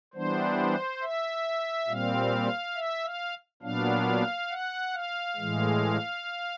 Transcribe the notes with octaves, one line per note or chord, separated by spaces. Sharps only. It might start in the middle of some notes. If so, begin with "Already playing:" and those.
E3 G3 B3 D4 C5
E5
A#2 G3 C4 F5
E5
F5
A#2 F#3 B3 D4 F5
F#5
F5
A2 E3 G#3